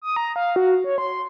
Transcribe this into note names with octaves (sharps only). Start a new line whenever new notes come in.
D#6
A#5
F5
F#4
C#5
C6